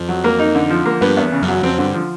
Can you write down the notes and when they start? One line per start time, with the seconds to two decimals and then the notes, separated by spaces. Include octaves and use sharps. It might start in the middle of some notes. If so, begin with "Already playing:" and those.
Already playing: F2
0.09 F#3
0.24 A#3
0.39 D#4
0.55 D3
0.70 F3
0.86 A#3
1.01 G2 B3
1.17 E2
1.32 C#3
1.42 F#2
1.48 F#3
1.63 F2 C4
1.78 G2 D3
1.94 F3